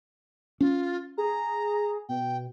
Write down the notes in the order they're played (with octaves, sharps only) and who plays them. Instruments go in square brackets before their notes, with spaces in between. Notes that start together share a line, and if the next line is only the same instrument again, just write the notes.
[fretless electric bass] C#4 [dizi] F4
[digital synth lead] G#4 [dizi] A#5
[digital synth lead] B2 [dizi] G5